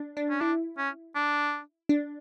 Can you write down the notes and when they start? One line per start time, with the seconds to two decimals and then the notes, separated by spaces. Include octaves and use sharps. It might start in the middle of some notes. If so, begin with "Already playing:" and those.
Already playing: D4
0.17 D4
0.30 C#4
0.41 D4 E4
0.78 C#4
1.15 D4
1.89 D4